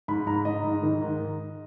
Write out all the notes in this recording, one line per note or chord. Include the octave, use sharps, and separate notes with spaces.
G#2 B5
G#2 A#5
G#2 D#5
G#2
D#3
G#2